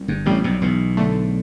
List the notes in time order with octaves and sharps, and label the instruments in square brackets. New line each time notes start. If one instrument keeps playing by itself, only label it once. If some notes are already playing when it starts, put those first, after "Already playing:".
Already playing: [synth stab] C2
[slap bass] G1 G2
[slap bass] A1 A2 [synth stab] C3 G3
[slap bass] B1 B2
[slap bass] B1 B2 [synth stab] E2
[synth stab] D3 A3